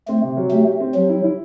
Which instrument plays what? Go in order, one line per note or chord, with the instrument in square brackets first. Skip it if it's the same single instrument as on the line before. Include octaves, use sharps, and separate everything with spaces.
[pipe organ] A3 [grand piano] C4
[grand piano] C3
F#3
[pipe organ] A3 [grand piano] G4
[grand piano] G4
C4
[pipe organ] F#3 [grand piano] G4
[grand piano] E4
E4